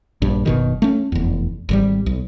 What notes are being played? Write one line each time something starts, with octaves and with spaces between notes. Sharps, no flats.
A#1 G2
F#1 B2 D#3
A3 C#4
F1 E2
G#1 D3 G3
B1